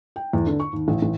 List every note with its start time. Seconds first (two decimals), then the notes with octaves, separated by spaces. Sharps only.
0.16 G5
0.33 E2
0.47 D3
0.60 C#6
0.73 D#2
0.88 A1
1.02 A1